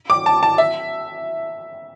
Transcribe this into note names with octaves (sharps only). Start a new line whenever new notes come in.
D6
A5
A5
E5